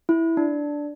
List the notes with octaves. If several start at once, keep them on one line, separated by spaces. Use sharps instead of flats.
E4
D4